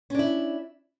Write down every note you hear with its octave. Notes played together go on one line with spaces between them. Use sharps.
C#4 D4 E4